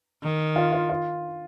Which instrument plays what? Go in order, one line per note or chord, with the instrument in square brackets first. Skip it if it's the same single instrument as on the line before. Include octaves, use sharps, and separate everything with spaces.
[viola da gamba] D#3
[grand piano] F4
F4
F4